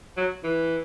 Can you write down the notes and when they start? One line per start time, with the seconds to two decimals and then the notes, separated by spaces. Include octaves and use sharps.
0.17 F#3
0.44 E3